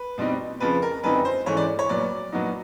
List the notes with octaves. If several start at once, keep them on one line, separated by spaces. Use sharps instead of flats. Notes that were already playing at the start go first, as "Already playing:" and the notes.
Already playing: B4
B2 G3 C4 D#4
F2 C#3 F3 B4
A#4
F#2 D3 G3 C4 D#4 B4
C5
G#2 E3 A3 C#4 C#5
D5
C#5
A#2 F#3 B3 D5
A#2 F#3 B3 D#4